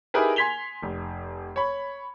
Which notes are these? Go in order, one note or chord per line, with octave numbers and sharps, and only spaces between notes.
D#4 E4 G4 G#4 A#4 B4
G#5 C6 G#6 B6 F7 G7
F1
C#5 B5